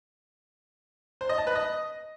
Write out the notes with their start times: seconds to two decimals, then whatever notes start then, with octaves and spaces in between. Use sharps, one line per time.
1.21 C5
1.29 D#5
1.38 A5
1.47 B4
1.55 D#5